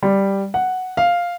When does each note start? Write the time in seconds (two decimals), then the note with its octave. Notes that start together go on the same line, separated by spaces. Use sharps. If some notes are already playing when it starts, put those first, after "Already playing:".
0.03 G3
0.54 F#5
0.97 F5